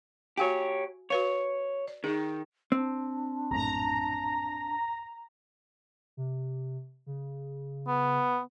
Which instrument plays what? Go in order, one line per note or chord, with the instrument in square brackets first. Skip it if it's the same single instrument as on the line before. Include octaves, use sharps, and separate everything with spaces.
[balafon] F#4 F5 G#5 [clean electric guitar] G4 C#5
[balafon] F#4 B4 F5 [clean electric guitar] C#5
[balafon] D5
[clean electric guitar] D#3 [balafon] D#4 G#4
[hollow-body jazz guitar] C4 [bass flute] D4
[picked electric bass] A#1 F#2 A2 [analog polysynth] A#5
[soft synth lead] C3
C#3
[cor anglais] B3